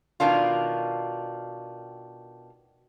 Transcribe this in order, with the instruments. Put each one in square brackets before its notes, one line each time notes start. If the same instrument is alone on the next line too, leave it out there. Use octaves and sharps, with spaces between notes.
[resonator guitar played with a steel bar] B2 D#3 D4 F4